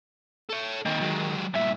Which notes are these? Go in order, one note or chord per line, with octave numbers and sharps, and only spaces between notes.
A4 C#5
D#3 A#3 C4
F#3 G#3
D2 G2 A#2 E5